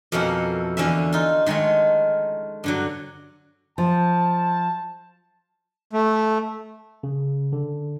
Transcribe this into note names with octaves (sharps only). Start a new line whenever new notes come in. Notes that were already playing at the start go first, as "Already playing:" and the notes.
F2 B2 A#3 C#4 E4 A4
E2 D3 E3 C#4 E5
D#4 F4
D#3 G#3 A3 D#4 C#5
G2 D3 F#3
F3 A5
A3
C#3
D3